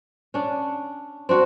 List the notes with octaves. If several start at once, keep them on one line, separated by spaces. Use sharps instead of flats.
C#4 D4
C4 D4 F#4